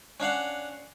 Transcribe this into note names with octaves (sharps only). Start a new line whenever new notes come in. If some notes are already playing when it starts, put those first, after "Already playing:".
C#4 D4 F5 F#5